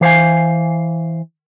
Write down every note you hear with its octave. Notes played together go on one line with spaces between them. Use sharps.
E3 C5 F5 G#5